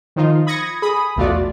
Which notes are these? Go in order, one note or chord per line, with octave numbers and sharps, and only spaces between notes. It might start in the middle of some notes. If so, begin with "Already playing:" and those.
D#3 F3 D#4 F4
B5 D#6 G#6 A#6 C#7
G#4 B5 D#6
B1 E2 A3 F4 F#4 D5